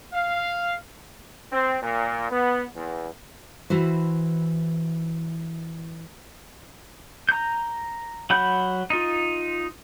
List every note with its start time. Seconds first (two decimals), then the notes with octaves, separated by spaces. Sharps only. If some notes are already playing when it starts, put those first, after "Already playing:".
0.13 F5
1.52 C4
1.82 A#2
2.30 B3
2.75 E2
3.70 E3 E4 F#4 C5
7.29 A#5 G6
8.30 F#3 F#5 B5 G6
8.90 D#4 F4